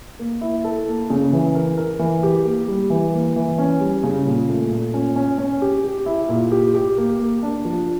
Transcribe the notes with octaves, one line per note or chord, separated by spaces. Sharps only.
A#3
E4
A4
A#3
C#3
E3
A#4
A#4
E3
G4
A#3
G3
E3
A#3
E3
C#4
G3
C#3
A#2
A3
A#2
C#4
C#4
C#4
G4
G4
E4
A#2
G4
G4
A#3
A#3
D4
F3